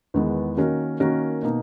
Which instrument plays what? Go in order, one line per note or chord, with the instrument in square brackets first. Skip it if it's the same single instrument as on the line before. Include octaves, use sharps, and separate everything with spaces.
[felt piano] E2 D#3 G#3 B3
D#3 A#3 C#4 F#4 A#4
D#3 A#3 C#4 F#4 A#4
B2 A#3 D#4